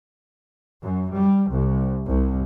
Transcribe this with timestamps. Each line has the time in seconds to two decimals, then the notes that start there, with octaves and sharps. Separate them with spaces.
0.82 F#2
1.15 G3
1.50 C2
2.07 C2